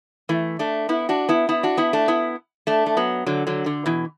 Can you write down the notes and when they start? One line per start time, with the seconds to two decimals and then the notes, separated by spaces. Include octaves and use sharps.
0.29 E3 A3
0.59 A3 D4
0.89 B3 E4
1.09 D4 F#4
1.29 B3 E4
1.49 B3 E4
1.63 D4 F#4
1.77 B3 E4
1.93 A3 D4
2.08 B3 E4
2.67 A3 D4
2.86 A3
2.97 F#3 B3
3.26 D3 F#3
3.47 D3 F#3
3.66 D3
3.86 B2 E3